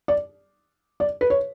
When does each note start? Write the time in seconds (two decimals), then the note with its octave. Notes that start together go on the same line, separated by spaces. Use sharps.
0.08 D5
1.00 D5
1.21 B4
1.30 C#5